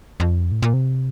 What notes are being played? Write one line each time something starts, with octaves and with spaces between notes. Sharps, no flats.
F2
A2
A#2
C3